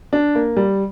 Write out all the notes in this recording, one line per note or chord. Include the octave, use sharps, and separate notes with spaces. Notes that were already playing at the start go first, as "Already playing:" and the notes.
D4
A#3
G3